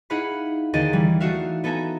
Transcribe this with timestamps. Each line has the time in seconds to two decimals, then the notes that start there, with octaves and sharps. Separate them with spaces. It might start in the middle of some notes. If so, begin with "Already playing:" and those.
0.10 D#4 E4 G#4 F5 F#5 B5
0.74 D#2 D3 G#4 A#4 D#5 A6
0.93 E3 G3
1.20 A3 D4 D#4 F#4 E5 F5
1.64 B3 A4 E5 G#5 A#5